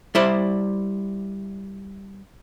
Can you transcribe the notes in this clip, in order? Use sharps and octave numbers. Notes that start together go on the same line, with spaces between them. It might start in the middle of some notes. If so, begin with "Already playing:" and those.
G3 E4 C5 D5